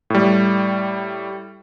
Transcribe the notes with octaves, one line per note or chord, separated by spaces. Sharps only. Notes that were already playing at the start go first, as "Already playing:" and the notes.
A2 G3